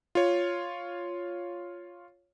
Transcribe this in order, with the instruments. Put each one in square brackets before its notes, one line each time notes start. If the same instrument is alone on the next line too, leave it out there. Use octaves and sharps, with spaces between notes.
[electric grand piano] F4 C#5